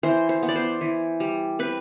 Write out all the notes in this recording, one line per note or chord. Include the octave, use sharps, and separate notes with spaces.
E3 C5
C5
B3
D5
C5
E3
G3
C4 B4